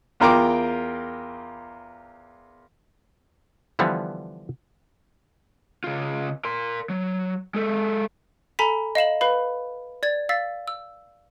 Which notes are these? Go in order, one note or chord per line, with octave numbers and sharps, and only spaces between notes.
E2 F4 A#4 G5 A#5 D6
D3 E3 F3 G3 B3
C#3 F4
A#4 C6
F#3
G#3 A4
A4 G#5 A#5 B5 B6
D#5 F5 E7 F#7
B4 F5 B5
D5 G#6 A6
F5 E6 A6 B6
E6